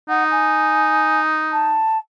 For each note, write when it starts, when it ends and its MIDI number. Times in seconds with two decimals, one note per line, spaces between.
0.09 1.83 63
0.09 0.24 78
0.31 1.20 80
1.52 1.98 81